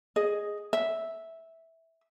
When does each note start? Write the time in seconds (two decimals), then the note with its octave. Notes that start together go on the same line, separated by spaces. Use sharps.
0.16 G#4 D#5
0.73 E5